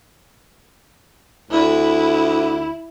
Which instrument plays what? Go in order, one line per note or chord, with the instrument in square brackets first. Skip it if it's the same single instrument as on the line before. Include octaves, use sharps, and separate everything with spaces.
[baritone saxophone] D2 [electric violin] E4